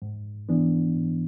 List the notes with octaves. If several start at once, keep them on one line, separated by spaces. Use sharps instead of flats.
G#2
E3 B3 D4
G#2